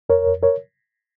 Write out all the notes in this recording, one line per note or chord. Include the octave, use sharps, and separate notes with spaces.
F2 A#4 C#5
F2
A#4 C#5